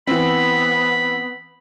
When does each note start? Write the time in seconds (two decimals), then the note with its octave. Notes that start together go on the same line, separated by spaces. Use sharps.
0.07 E3 B3 C4 B5